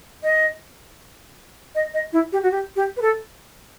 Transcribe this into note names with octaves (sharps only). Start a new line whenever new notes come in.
D#5
D#5
D#5
E4
G4
F#4
G4
G4
B4
A4